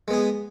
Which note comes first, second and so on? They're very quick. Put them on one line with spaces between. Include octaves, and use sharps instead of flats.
G#3 B3 G#4